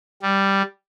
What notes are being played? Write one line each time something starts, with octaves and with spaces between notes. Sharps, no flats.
G3